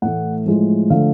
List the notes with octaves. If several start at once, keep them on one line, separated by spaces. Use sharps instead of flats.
A2 E3 A3 F#5
A2 F3 G#3
D3 F3 A3 F5